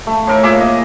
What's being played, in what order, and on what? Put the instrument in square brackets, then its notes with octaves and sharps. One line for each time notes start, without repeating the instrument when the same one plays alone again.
[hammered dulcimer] A3
A2 A#4 C#6
A#2 G#4 E5 D6
D#5